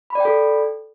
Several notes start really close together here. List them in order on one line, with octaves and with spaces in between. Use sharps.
B5 D5 G5 A4